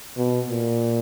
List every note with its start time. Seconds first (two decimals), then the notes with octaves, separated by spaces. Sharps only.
0.17 B2
0.49 A#2